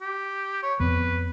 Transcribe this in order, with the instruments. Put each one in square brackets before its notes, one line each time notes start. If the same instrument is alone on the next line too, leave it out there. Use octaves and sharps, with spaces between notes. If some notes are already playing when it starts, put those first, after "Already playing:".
[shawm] G4
C#5
[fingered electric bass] F2 B3 C4 [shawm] B4